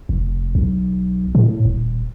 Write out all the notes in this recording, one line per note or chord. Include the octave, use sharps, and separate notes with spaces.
F1
B1
A2
D#1